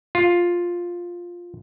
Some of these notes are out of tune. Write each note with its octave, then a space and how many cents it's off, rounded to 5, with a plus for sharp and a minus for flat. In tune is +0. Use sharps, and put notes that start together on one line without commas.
F4 +5